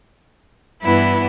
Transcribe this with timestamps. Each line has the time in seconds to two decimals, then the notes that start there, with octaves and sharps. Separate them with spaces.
0.83 G2 E3 B3 E4